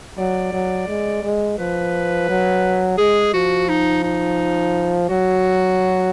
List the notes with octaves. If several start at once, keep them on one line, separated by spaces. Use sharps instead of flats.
F#3 D5
F#3
G#3
G#3
F3 B4
F#3
G#3 G#4
F3 F#4
D#4
D#4
F#3 F#4